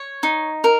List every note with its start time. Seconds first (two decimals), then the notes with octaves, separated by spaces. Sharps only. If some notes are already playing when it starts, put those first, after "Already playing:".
Already playing: C#5
0.23 D#4
0.64 A#4